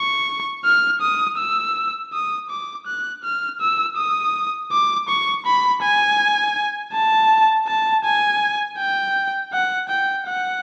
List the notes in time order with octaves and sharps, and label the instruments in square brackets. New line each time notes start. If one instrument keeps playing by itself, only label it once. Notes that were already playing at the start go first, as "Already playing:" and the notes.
Already playing: [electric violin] C#6
F6
D#6
E6
D#6
D6
F#6
F6
E6
D#6
D6
C#6
B5
G#5
A5
A5
G#5
G5
F#5
G5
F#5